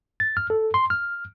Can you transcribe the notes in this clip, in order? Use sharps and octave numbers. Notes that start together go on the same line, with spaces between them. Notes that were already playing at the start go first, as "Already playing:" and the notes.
A6
F6
A4
C6
F6